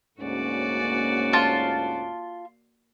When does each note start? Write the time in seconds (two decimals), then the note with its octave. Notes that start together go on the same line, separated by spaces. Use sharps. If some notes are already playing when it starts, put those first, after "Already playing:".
0.20 D2 G#2 A#3 C#4 F#4 D5
1.33 F4 A5